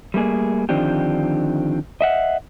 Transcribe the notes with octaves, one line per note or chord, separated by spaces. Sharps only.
G3 A3 A#3 G#4
D3 D#3 F3 C4 D4 G4
D#5 E5 F#5